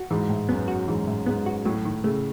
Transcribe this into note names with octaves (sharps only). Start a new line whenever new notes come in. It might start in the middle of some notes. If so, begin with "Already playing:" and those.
Already playing: F#4
G#2 E3
A2
F#2 B3
F#4
G#2 E3
A2
G#2 B3
F#4
A2 F#3
D#3
C#3 A3